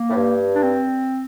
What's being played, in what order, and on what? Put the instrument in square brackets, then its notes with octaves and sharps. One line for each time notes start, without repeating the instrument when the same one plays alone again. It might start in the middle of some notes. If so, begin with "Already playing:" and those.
Already playing: [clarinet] A#3
[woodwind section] A2
G2
[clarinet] D4
C4